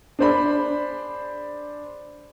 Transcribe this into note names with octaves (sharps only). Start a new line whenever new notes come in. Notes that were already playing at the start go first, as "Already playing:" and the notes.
D4 G#4 C5 D5 B5